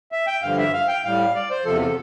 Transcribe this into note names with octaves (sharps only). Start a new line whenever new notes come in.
E5
G5
G2 D3 F3 F5
E5
F5
G5
A2 G3 F5
D5
C5
E2 C3 F3 A4
A4